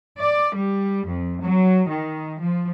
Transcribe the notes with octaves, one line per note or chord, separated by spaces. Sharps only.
D5
G3
F2
F#3
D#3
F3